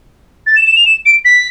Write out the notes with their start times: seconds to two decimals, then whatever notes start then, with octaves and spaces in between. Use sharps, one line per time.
0.47 A6
0.56 E7
0.67 E7
0.76 F7
0.86 E7
1.06 D7
1.25 B6